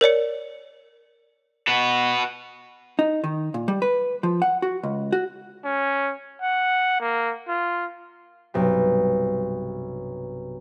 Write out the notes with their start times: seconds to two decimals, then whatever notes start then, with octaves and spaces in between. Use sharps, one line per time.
0.01 A#4 C#5 D5 C#7
1.67 F#4 B4
2.99 D#4
3.24 D#3
3.54 A#2
3.68 G3
3.82 B4
4.23 F3
4.42 F#5
4.62 F#4
4.83 C#2
5.12 F#4
5.65 C#4
6.42 F#5
7.00 A#3
7.48 F4
8.54 B1 G2 C3